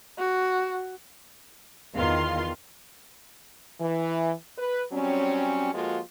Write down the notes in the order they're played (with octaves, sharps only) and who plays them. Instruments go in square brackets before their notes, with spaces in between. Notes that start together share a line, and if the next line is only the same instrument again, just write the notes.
[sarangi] F#4
[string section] E2 D#3 B3 F4 F5 C6
[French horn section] E3
B4
F#3 G3 C4 C#4
F3 G#3 A#3 F4 F#4 A4